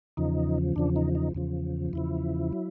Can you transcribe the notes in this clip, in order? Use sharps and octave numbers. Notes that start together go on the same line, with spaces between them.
E2 C#3 F3 D#4
E2 C#3 F3 D4
D#4
D#4
E2 C#3 F3
E2 C#3 F3 E4
F#3